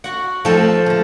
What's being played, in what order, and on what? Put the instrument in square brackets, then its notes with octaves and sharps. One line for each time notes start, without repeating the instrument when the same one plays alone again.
[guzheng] F#4 F#5
[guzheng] F3 A4 [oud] A3 C4 D#4
[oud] D3 A3